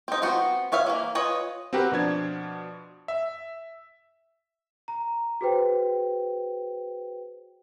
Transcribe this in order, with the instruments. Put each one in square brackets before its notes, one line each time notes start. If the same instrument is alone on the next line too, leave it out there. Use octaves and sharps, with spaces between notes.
[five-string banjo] C4 D#4
B3 C4 F#4
B3 C#5 E5 F5
E3 A#3
F4 B4 C#5 D#5
[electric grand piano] C4 F#4 G4 A#4 B4
B2 F3 D4 G#6
E5
[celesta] A#5
F#4 G#4 B4 C5 G5